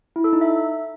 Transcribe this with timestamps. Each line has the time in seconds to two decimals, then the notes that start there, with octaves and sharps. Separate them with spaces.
0.16 E4
0.24 A4
0.33 D#4
0.41 E5